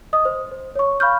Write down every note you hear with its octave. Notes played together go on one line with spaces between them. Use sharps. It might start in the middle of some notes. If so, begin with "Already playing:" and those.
D#5 D#6
C5
C5
C#5 C#6
F5 B5 C#6 F6 G6